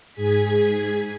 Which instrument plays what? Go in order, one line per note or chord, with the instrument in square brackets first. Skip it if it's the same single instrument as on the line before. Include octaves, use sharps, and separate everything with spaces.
[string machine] G#2 G#4 G#5 G#6 B6